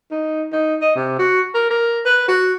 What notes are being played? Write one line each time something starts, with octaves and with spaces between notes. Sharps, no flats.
D#4
D#4
D#5
C3
F#4
A#4
A#4
B4
F#4